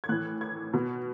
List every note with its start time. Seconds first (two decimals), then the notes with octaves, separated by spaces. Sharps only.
0.04 G#6
0.09 A2 E3 F#6
0.41 G#6
0.73 B2